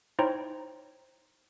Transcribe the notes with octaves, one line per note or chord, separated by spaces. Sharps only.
D#4 E4 C5 C#5 G5 A#5